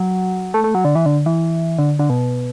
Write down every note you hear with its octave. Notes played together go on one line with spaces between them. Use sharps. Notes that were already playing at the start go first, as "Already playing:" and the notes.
Already playing: F#3
A3
A3
F#3
D3
E3
D3
E3
D3
D3
B2